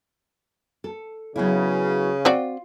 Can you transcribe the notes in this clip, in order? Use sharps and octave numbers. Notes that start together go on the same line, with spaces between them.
A4
C#3 F#3 B3 E4
C4 F4 F#4 D5